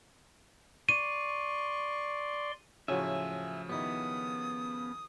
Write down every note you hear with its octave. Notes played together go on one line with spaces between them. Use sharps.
D5 C6 C#6 D#7
A2 C#3 F3 F#3 F#4 E5 G#5
D#3 B3 E4 G4 D#6